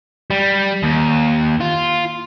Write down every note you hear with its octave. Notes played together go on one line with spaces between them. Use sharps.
G3
D#2
F4